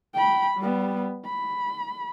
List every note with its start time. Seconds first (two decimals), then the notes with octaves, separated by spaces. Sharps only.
0.15 G5 B5
0.58 G3 B3
1.26 B5